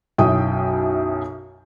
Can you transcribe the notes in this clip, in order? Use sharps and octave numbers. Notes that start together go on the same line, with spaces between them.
B1 F#2 E4 G5 D#6